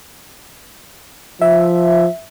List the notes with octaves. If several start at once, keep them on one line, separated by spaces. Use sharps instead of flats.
F3 E5